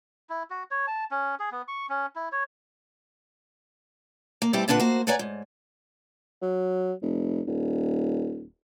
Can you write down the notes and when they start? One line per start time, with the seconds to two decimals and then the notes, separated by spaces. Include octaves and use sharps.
0.30 E4
0.50 F#4
0.71 C#5
0.87 A5
1.11 C#4
1.39 G#4
1.52 B3
1.68 C#6
1.89 C#4
2.16 E4
2.32 C#5
4.42 A#3
4.53 B2 G3 C4 E4 G4
4.68 A#2 D3 D4 B4 F#5
4.80 A#3 F#4 C5
5.07 B4 C#5 D5 F#5 G#5 A#5
5.19 G#2
6.42 F#3
7.02 F1
7.47 D#1